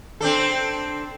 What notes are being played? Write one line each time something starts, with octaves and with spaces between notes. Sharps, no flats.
C4 D4 A4